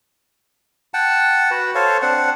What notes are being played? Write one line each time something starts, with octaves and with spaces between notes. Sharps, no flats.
F#5 G5 A5
F#4 B4
A4 C5 C#5 F5
C4 D4 F#5